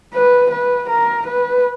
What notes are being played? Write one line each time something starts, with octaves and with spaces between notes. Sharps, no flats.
B4
B4
A#4
B4